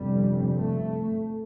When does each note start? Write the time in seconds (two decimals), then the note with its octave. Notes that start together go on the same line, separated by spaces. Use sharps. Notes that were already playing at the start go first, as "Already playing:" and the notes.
Already playing: G1 F2 C3 G3
0.55 A3